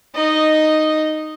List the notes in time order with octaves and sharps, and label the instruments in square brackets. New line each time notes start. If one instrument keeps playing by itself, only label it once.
[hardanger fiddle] D#4 D#5